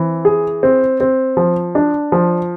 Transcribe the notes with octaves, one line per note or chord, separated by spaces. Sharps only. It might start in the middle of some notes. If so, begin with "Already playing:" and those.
Already playing: E3 C4
G#4
C4
C4
F3
D4
F3